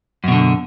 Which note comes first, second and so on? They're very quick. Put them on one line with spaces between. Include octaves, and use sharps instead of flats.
F#2 B2 D3